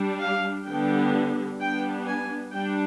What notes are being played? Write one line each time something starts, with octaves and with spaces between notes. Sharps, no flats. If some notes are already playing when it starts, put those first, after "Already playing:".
Already playing: G3 D4
F5
D3 G3 B3 D4 G5
G3 B3 D4 G5
G#5
G3 D4 G5